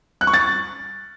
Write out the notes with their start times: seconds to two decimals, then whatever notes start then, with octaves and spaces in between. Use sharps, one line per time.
0.21 F#6
0.27 C#6
0.33 A6